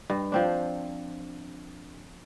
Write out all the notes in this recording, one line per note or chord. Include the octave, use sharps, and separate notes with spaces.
G2
F3 C4 D4